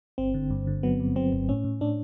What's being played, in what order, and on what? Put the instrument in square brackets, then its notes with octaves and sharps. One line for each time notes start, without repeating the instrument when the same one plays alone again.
[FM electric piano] G1 C4
D3
G2
D3
F#3 B3
G2
F#3 C4
G1
A2 C#4
A2
A2 D4